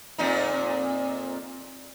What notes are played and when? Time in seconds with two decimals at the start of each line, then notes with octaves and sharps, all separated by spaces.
0.18 F2 A#2 D#4